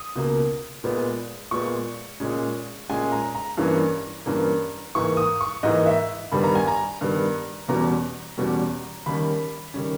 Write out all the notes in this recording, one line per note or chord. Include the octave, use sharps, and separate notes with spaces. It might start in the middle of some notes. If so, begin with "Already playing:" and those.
Already playing: D#6
C#2 B2 A#3
A#2 G#3 B3
A#2 G#3 B3 C#6
A#2 G#3 C#4
A#2 G#3 C#4 G#5
A#5
A#5
G2 E3 A#3 C#4
G2 E3 A#3 C#4
G#2 E3 A#3 C#6
D#6
C#6
G#2 E3 A#3 D#5
E5
G2 D#3 G3 B3 B5
A#5
G#5
A#5
G2 D#3 G3 B3
E2 B2 G3 C#4 A#5
E2 B2 G3 C#4
D#2 D#3 G3 C#4 B5
D#3 G3 C#4